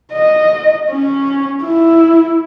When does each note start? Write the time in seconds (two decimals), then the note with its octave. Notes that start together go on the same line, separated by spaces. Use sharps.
0.13 D#5
0.91 C#4
1.63 E4